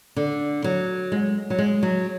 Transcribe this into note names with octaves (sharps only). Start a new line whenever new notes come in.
D3
F#3
G#3
F#3
G#3
F#3